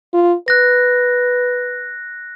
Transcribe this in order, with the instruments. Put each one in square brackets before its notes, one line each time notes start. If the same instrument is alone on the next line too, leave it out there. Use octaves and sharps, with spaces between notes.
[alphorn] F4
[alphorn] B4 [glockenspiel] F#6 A#6